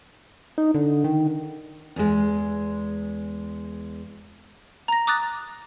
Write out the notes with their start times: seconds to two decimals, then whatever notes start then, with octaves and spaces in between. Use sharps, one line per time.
0.58 D#4
0.74 D3
1.04 D#3
1.96 E2 G#3
4.88 A#5 A#6
5.07 D6 D#6 F#6 A6